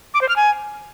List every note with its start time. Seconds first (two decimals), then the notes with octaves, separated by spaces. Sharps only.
0.14 D6
0.21 C5
0.29 F6
0.36 G#5